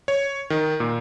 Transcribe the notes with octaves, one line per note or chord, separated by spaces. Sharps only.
C#5
D#3
A#2